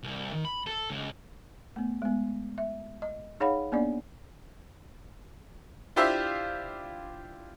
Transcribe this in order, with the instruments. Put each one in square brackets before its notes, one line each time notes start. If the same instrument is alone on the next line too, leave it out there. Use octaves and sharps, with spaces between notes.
[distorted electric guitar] C2
D#3
B5
A4
C#2
[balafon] A3 B3
G#3 B3
E5
D#5
D#4 G#4 C#5 F5 F#5 B5
A#3 B3 D4 D5
[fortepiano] D4 E4 F4 G4 C5 E5